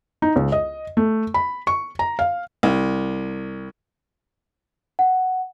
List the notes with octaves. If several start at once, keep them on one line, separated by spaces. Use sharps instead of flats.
D#4
C#2
D#5
A3
B5
C#6
A#5
F5
C2
F#5